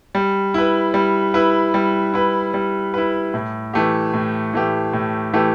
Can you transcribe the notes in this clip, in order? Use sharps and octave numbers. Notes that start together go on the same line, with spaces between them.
G3
E4 B4
G3
E4 B4
G3
E4 B4
G3
E4 B4
A2
E3 A3 G4
A2
E3 A3 G4
A2
E3 A3 G4